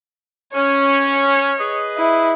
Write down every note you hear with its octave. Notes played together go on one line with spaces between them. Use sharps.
C#4 C#5
G#4 B4 D#5
E4